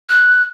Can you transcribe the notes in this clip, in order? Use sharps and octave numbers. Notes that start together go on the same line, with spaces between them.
F#6